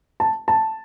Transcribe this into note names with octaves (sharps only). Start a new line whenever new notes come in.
A5
A5